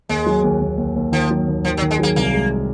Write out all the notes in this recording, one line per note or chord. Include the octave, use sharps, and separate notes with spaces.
D#2 G#3
F#3
D#2
D#2
D#2
D#2
D#3 F3
F#3
D#2
D#3 F3
F#3
D#3
G#3
F#3 A#3
C2 A#3
G#3